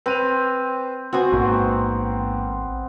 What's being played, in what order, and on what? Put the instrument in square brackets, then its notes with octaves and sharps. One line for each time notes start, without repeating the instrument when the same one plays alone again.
[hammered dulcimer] C4 [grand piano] B4 D#7 F7
[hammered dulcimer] B3 C4 [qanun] F#4 G#5
[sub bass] A1 [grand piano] G#2 A#3